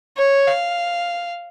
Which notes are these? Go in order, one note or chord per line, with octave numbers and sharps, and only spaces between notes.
C#5
F5